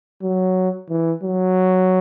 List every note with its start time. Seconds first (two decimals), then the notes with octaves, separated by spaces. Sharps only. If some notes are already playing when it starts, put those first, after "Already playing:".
0.22 F#3
0.90 E3
1.23 F#3